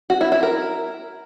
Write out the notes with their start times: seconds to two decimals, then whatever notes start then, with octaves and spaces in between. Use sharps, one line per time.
0.10 F#4
0.21 E4
0.32 E4
0.43 A#4